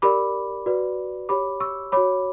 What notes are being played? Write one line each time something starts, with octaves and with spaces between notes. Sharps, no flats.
G4 A#4 D5 B5 D6
F#4 B4 D5
G4 C#5 B5 D6
C#6 E6
F#4 C#5 B5 D6